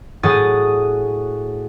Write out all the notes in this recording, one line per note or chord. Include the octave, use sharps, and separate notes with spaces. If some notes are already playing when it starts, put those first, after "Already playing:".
A2 F#3 G#4 D#6 A6